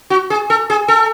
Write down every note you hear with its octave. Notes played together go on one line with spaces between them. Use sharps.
F#4
G#4
A4
G#4
A4